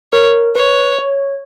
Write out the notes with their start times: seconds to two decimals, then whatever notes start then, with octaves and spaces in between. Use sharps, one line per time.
0.13 A#4 C#5
0.55 B4 C#5
0.99 C#5